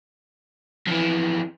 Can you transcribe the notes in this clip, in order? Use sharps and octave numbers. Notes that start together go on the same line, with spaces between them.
F2 E3